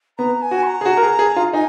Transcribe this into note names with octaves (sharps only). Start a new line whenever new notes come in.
B3 A#5
G#5
F#4
C#6
A#5
G#4
F#4
A#4
G#4
G#4
F4
D#4 G#5